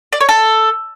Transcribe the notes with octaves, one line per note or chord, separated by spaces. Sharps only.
D5
C#5
A4